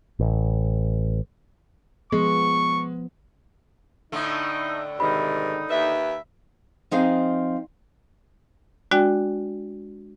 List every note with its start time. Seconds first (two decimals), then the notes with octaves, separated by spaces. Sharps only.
0.19 A1
2.12 F3 G#3 B3 C#6
4.12 A2 D3 A3 D#4
5.00 G#2 C3 D#3 D#4 B5
5.70 D#2 B4 E5
6.91 F3 C4 D#4 G#4 F5
8.91 G#3 D4 F#4 D5 G5